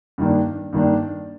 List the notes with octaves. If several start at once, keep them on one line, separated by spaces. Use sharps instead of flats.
G2 D#3 A#3 D4
G2 D#3 A#3 D4